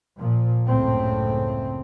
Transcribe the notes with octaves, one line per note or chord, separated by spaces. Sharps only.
A#2 F3
F#1 C#2 A2 C#3 A3 C4